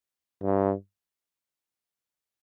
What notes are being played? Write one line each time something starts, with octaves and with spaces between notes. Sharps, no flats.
G2